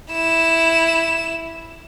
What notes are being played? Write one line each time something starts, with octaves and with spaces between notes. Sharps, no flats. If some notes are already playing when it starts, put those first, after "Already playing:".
E4 E7